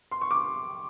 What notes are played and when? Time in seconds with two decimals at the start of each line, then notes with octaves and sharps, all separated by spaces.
0.11 C6
0.21 C#6
0.31 D6